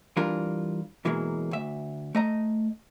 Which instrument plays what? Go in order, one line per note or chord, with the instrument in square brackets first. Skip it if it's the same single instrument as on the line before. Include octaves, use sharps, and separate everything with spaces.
[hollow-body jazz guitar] E3 G3 D4 F4 A#4
B2 E3 F#3 G#3 A#3
D2 E5
A3 D#5 A#5